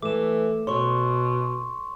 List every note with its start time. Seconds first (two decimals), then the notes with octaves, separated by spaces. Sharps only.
0.02 E3 A3 D6 E7
0.67 B2 C#5 C6 C#6